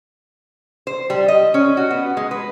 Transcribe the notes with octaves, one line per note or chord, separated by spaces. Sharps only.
C5
G3
D#5
C#4
F#4
B3
G#3
B4